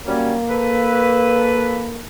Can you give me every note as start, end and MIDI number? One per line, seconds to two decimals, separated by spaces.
0.05 0.33 54
0.05 0.33 55
0.05 2.02 58
0.05 0.33 61
0.49 1.96 69
0.49 1.96 71